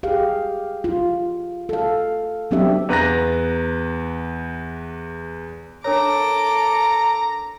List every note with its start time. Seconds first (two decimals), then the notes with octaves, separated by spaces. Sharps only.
0.03 G4 G#4 F5
0.84 F4
1.69 A4 F5
2.51 F#3 B3 C4 D4 G4 E5
2.89 E2 B4 A#5 F#6 A#6
5.85 D4 A4 A#4 C#5 A#5 D6